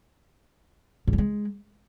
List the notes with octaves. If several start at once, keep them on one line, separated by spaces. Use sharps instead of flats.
G#2
G3
G#3